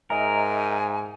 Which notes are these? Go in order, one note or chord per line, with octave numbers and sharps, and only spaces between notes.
G#2 A#4 D#5 E5 G#5 A#5